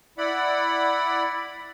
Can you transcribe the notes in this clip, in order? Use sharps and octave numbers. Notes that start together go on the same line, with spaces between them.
E4 D5 F#5 B5